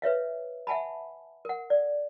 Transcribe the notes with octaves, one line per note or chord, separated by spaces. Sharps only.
B4 C#5 E5 F5
E5 F#5 G#5 A5 B5
A#4 F#5
D5